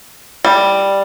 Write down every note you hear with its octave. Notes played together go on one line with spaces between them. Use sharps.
G3